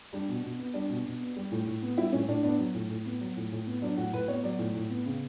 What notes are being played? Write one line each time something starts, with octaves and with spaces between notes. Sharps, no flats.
G3 D4
B2
B2
B3
G3 D4
B2
B2
B3
G3
A2
A2
B3
G3 E4
A2 C#4
A2 D4
B3 D4
F#3
A2
A2
B3
F#3
A2
A2
B3
F#3 D4
A2 F#4
A2 B4
B3 C#5
F#3 D5
A2
A2
B3
C#3